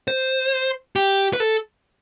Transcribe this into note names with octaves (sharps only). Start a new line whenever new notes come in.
C5
G4
B4
A4